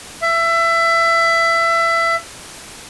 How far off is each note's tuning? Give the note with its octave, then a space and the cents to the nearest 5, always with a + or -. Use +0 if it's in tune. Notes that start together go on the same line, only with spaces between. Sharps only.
E5 +25